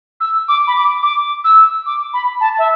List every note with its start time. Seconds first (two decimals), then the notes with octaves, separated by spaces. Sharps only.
0.20 E6
0.48 D6
0.67 B5
0.76 D6
1.03 D6
1.44 E6
1.86 D6
2.13 B5
2.40 A5
2.58 E5